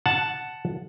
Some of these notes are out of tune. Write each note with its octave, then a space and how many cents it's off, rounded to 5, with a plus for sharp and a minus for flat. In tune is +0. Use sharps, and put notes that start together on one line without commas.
F#5 +0 A5 +0